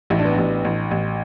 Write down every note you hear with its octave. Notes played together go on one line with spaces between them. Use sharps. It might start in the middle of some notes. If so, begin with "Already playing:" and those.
A1 E4
D4
B3
A1 D4
A1
A1